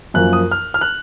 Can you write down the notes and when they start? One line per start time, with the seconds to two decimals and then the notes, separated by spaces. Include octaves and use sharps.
0.14 F#2 F3 A#3 F#6
0.33 D#6
0.51 F6
0.74 F6
0.81 F#6